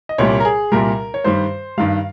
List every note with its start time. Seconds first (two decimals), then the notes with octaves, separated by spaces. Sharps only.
0.09 D#5
0.18 C2 A#2 G3 C#5
0.40 A#4
0.45 G#4
0.72 C2 A#2 G3 A#4
1.14 C#5
1.24 G2 D#3 G3 C5
1.78 G2 D#3 G3 F5